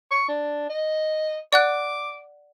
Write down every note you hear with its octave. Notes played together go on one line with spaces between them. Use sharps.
C#6
D4
D#5
D5 F#5 D6 F#6